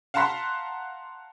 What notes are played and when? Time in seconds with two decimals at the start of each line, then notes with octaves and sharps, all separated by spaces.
0.14 F5 F#5 A5 A#5 C6 B6